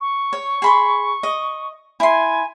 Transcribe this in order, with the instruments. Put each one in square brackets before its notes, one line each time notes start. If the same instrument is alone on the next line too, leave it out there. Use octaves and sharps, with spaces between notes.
[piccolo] C#6
[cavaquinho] C#5
G#4 B5 C6
D#5
[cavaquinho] E4 C6 [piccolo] G#5